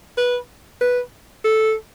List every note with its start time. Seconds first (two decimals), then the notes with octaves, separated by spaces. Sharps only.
0.18 B4
0.81 B4
1.44 A4